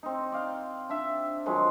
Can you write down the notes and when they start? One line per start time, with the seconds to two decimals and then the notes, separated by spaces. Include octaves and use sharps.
0.03 C4 D#4
0.32 D5 F5 G5
0.89 D4 E5
1.46 D#3 F3 F#3 G#3